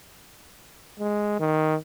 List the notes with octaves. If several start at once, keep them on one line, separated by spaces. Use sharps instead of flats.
G#3
D#3